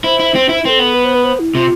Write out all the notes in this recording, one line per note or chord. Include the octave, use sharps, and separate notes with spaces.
E4 C5
E4
C4
E4
C4 A4 B4
B3
B4
C5
B4
C5
E4
C3 F4